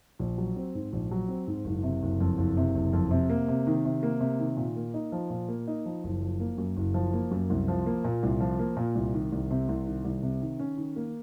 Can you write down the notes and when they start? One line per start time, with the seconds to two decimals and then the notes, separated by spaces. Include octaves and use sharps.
0.19 A#1
0.38 F#3
0.56 C4
0.75 G#2
0.93 A#1
1.11 F#3
1.28 C4
1.48 G#2
1.65 F#1
1.83 C3
2.03 F#1
2.20 F2
2.38 F#1
2.57 C3
2.75 F#1
2.93 F2
3.11 C3
3.30 A#3
3.48 C3
3.67 D#3
3.85 C3
4.03 A#3
4.20 C3
4.40 D#3
4.57 A#2
4.76 A#3
4.94 D#4
5.12 F3
5.30 A#2
5.48 A#3
5.68 D#4
5.85 F3
6.04 F#1
6.22 F3
6.40 A#3
6.58 F#2
6.77 F#1
6.94 F3
7.14 A#3
7.31 F#2
7.50 C2
7.68 F3
7.86 A#3
8.04 A#2
8.23 C2
8.40 F3
8.59 A#3
8.77 A#2
8.95 C2
9.14 D#3
9.32 C2
9.51 C3
9.69 C2
9.87 D#3
10.05 C2
10.22 C3
10.42 D#3
10.59 C#4
10.77 D#3
10.96 A#3